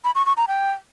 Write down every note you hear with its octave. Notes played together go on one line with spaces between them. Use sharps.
B5
C#6
C#6
A#5
G5